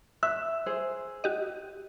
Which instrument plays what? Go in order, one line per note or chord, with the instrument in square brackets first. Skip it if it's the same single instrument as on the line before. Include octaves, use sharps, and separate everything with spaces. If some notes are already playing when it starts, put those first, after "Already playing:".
[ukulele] E5 [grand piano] E6 [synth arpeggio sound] F#6
[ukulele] G#4 C5
[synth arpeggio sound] F#4 G4 D#5